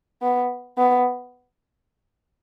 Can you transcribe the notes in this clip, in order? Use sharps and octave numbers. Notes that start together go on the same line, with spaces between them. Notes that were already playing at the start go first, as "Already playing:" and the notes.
B3
B3